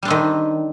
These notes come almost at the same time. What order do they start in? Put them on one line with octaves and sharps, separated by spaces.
G3 D4 C4 D#3